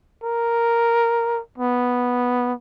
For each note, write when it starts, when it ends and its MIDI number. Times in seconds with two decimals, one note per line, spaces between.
0.24 1.41 70
1.58 2.53 59